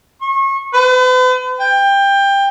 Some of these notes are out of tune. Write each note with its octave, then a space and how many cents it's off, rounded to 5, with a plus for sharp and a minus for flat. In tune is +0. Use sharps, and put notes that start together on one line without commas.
C#6 -30
B4 +45
G5 +20